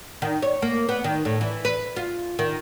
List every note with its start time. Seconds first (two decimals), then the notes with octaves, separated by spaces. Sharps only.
0.22 D#3
0.42 C#5
0.62 A#3
0.89 B3
1.04 D#3
1.25 A2
1.41 E3
1.65 B4
1.96 F4
2.39 D#3